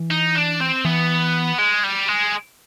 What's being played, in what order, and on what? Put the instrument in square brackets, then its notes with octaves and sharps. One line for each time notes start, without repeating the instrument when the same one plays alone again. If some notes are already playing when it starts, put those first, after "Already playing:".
Already playing: [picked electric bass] E3
[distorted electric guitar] D#4
D4
C4
[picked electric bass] E3 [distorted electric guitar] B3
[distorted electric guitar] G#3
G3
G#3